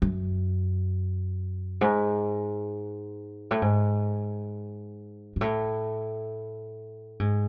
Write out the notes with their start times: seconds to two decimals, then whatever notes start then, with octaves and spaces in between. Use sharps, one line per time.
0.02 F#2
1.81 G#2
3.51 A2
3.62 G#2
5.36 G#2
5.41 A2
7.20 G#2